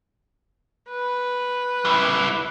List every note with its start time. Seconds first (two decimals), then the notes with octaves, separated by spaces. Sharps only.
0.90 B4
1.85 G3 E4